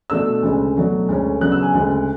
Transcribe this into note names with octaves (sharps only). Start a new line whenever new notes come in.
B2 A3 D4 E6
D2 C#3 G#3
B2 F#3 A3 D4
D2 D3 G#3 C#4
C#3 F#3 B3 D4 F#6
E6
G#5
D2 C#3 G#3